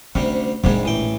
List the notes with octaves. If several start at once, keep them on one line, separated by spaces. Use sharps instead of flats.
D2 C3 G3 C#4
A#1 G#2 C3 G3 G#3
A1 E3 G5